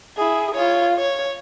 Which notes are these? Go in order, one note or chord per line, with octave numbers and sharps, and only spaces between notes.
E4 G#4
F4 C#5
C#5